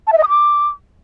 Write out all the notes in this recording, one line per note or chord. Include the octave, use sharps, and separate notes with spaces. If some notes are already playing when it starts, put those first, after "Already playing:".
A5
E5
D#5
D#6
D6